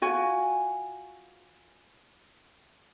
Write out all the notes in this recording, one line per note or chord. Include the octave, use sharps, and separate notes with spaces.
F4 F#4 G#5